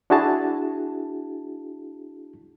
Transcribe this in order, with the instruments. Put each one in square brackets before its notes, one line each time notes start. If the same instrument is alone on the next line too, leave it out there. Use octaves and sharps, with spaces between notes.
[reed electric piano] D4 E4 F#4 G#4 A5